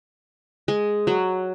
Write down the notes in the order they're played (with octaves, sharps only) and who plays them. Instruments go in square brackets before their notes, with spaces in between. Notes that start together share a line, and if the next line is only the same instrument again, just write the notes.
[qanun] G#3
F#3